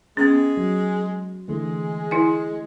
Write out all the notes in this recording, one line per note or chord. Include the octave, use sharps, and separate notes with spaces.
G#3 B3 C#4
F#3
D3 E3 G#3 A3
E4 G#5